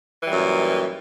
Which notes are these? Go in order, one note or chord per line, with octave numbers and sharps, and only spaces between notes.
F#2 A#2 E3 G3